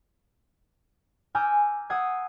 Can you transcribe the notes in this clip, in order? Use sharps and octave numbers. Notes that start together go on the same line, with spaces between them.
G#5 A#5 D6 E6 F6 G6
F#5 D#6 E6 G#6 C7